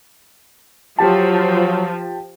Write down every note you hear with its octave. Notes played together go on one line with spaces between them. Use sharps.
F3 F#3 G4 A5